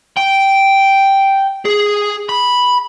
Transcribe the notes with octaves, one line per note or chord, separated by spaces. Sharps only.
G5
G#4
B5